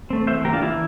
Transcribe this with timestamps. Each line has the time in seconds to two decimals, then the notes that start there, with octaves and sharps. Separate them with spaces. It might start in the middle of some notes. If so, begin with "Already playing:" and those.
0.10 A3 C4
0.27 E3 C5 E5
0.45 A#3 G4 A#4
0.53 D4 F4
0.62 E3 E4